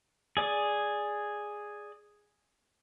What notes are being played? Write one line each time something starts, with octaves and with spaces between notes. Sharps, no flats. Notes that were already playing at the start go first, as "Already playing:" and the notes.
G#4 D5 D#6